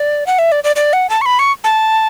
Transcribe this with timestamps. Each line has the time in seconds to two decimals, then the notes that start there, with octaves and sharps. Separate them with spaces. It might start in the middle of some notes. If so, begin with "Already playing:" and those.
Already playing: D5
0.27 F#5
0.39 E5
0.52 D5
0.64 D5
0.76 D5
0.93 F#5
1.10 A5
1.21 C#6
1.26 B5
1.39 C#6
1.64 A5